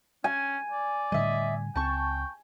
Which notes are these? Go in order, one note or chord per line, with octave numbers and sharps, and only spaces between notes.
C#4 G#5
D5
A2 D3 G3 D#5 E5
C#2 C4 G5 A5 C#6